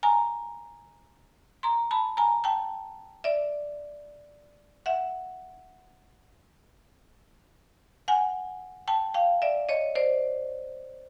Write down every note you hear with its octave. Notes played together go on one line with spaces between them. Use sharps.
G#5 A#5
A#5 C6
A5 B5
G#5 A#5
G5 A5
D5 E5
E5 F#5
F#5 G#5
G5 A5
F5 G5
D5 E5
C#5 D#5
C5 D5